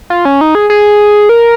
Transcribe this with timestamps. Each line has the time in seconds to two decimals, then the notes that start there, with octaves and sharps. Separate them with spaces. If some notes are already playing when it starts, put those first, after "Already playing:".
0.10 F4
0.25 C#4
0.41 D#4
0.55 G#4
0.70 G#4
1.29 A#4